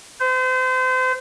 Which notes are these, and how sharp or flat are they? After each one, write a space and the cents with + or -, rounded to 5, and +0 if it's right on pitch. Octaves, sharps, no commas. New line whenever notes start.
C5 -35